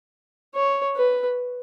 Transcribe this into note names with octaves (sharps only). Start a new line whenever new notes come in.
C#5
B4